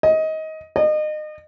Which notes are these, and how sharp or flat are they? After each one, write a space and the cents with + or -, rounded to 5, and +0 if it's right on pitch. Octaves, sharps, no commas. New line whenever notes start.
D#5 +20
D#5 -30